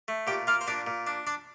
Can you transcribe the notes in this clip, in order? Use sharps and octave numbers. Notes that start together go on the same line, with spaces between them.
A3
A#2 G4 G5
A#3 F4 F5
C5
A#2 D4 D5
A#2
D4
D4 D5